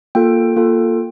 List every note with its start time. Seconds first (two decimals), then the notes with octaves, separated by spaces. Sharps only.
0.15 A#3 F4 A4 G5
0.56 A#3 F4 A4